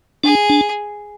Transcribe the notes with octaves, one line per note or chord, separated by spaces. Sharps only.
D4 G#4
D4